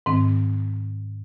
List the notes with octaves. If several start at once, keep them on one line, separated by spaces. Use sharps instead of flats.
G#2 D#3 C4